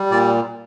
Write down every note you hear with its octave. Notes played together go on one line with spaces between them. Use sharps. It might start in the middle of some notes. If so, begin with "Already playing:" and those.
Already playing: G3
A#2 D5